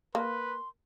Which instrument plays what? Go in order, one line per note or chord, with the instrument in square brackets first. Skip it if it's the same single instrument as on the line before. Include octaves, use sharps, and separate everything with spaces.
[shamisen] A#3 [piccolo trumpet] B4 [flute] C6